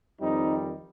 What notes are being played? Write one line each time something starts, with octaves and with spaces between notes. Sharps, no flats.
F2 D#3 G3 C4 D#4